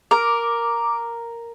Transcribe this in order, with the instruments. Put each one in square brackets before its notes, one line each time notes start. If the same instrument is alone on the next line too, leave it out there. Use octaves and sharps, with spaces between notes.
[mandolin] A#4 [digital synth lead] D6